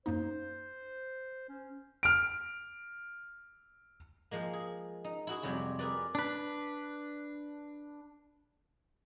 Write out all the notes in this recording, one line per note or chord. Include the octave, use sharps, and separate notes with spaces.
F#2 A#3 D#4 C5
C#4
F6 D7
F3 G#3 A#3
G#4
D#4
E4 F#4 G#4
F2 C3 F#3 G3 E4
G#4 A#4 B4 D5
D4 B4